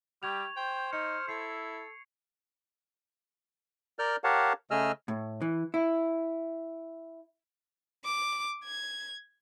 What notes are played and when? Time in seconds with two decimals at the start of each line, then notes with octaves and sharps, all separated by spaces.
0.23 G3 G4 C#6 G#6 F7
0.57 C5 G5
0.93 D#4 F6 C#7
1.28 E4 A4 C7
3.99 A#4 D5 F6 G6
4.24 G4 A#4 C#5 F5 F#5 A5
4.71 C#3 A3 G#4 D#5 E6 F6
5.08 A2
5.42 E3
5.74 E4
8.04 D6
8.64 G#6